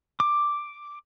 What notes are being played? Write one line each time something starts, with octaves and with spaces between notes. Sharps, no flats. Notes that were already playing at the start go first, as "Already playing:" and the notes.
D6